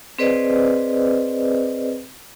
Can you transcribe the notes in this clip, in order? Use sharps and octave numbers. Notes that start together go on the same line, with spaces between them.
C4 G#4 B4 C5 D5 D#5